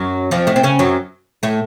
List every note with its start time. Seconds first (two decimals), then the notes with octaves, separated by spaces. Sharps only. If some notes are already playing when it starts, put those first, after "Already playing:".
Already playing: F#2 F#3
0.31 F2 F3
0.47 A2 A3
0.56 C4
0.63 C#3 C#4
0.79 F#2 F#3
1.43 A2 A3